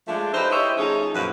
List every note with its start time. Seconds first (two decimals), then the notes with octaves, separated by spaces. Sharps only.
0.08 F3 G#3 A3 D4
0.33 D#4 G4 A4 B4 C5
0.50 E4 G4 C5 C#5 D#5 E5
0.78 F3 A3 C#4 D#4 G#4
1.15 F#2 A#2 F3 E4 F#4 B4